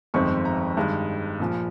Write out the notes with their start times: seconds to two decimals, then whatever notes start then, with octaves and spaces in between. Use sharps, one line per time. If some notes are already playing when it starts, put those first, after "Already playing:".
0.14 G1 F2 D#3 G#3 C4 C#6
0.45 A#5
0.77 G2 D#3 G#3
1.40 A#1 A#2 F3